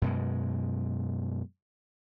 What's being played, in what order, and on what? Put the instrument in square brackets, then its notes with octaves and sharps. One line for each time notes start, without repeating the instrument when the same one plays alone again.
[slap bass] F#2 B2 G#3